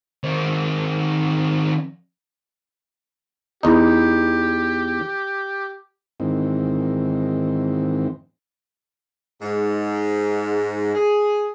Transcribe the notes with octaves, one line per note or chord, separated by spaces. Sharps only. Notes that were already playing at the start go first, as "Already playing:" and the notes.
D#3 C4
E2 D#4 G4
G#2 D#3 E3 C4
G#2
G#4